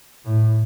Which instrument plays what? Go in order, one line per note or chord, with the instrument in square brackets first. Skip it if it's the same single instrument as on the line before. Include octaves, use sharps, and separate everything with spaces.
[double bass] A2